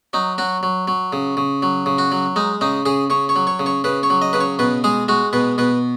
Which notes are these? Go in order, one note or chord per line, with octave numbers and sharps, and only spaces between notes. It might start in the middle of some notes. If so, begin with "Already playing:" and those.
F#3 D#4
F#3 F#4
F#3
F#3
C#3
C#3
F#3
C#3
F#4
F#3
G#3 D#4
C#3 D#4
C#3 G#4
C#3 C#5
C#5
F#3
C#5
C#3
C#5
C#3 B4
C#5
F#3
D#5
C#3 B4
C#5
B2 B4
G#3 G#4
G#3 F#4
B2 B4
B2 B4